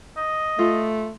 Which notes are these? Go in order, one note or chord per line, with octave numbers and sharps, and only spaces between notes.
D#5
A3 F4